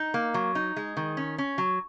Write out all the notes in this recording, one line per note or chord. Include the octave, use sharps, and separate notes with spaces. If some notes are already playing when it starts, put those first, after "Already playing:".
Already playing: D#4
A#3
F#3
D#4
G#3
D#3
C#4
C#4
F#3